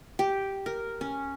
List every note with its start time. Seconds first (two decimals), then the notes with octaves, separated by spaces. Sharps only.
0.19 G4
0.66 A#4
1.01 C#4